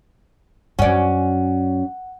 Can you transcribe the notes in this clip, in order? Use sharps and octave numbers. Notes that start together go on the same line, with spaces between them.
F#2 F#3 C#4 D5 F#5